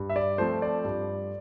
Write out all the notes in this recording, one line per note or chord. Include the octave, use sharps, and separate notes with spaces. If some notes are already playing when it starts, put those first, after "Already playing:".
Already playing: G2
E5
D5
F3 A3 C4 C5
D5
G2